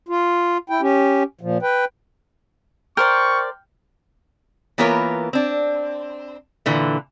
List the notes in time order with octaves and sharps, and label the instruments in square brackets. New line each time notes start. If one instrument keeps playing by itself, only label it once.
[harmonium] F4
E4 G5
C#4 G4
A#2 F3
B4 G5
[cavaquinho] A#4 C5 D5 [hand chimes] G5 F6 G6 [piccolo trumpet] C#6
[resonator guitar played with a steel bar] E3 A#3 B3 F4 A#4 C#5
C4 D4
A#2 D3 E3